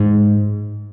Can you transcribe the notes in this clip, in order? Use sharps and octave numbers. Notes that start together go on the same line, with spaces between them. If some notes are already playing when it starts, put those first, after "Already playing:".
Already playing: G#2